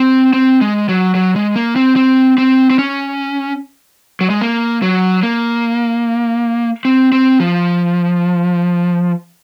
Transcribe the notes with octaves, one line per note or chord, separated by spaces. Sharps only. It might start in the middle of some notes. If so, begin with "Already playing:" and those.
Already playing: C4
C4
G#3
F#3
F#3
G#3
A#3
C4
C4
C4
C4
C#4
F#3
G#3
A#3
F#3
A#3
C4
C4
F3